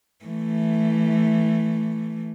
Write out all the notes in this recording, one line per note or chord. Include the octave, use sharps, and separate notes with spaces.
E3 A3